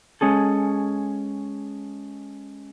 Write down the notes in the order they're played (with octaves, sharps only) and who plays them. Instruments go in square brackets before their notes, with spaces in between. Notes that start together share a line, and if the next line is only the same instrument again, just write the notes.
[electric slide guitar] G#3 C#4 G#4 A4